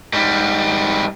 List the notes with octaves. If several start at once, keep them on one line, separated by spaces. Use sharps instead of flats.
G#2 G3